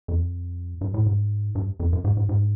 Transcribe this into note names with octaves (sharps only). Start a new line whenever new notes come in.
F2
G2
A2
G#2
G2
F2
F#2
G#2
G#2
G#2